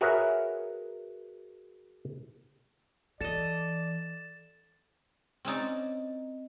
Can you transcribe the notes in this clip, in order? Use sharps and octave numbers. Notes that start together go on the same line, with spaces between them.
F#4 G#4 A#4 B4 C#5 E5
E3 A4 D5 D#5 A6 E7
C4 C#4 D#4 D5